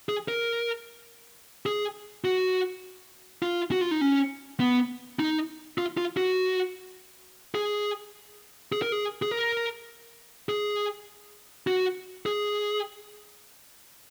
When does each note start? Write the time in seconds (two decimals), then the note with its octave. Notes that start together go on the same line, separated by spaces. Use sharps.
0.09 G#4
0.28 A#4
1.66 G#4
2.25 F#4
3.43 F4
3.72 F#4
3.81 F4
3.91 D#4
4.01 C#4
4.60 B3
5.19 D#4
5.78 F4
5.97 F4
6.17 F#4
7.55 G#4
8.72 G#4
8.82 A#4
8.92 G#4
9.22 G#4
9.31 A#4
10.49 G#4
11.67 F#4
12.26 G#4